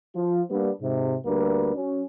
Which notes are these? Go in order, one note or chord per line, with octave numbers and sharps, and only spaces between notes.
F3 F4
G3 A#3 B3 D4
G#2 C3
D2 G3 A#3 D4 B4
F#3 C#4